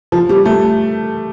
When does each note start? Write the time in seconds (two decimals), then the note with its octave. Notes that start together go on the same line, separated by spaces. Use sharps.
0.12 F3
0.29 G3
0.45 A3